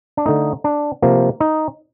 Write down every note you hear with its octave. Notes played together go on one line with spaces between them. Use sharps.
D4
D3 A3 D#4
D4
C3 F3 A#3
D#4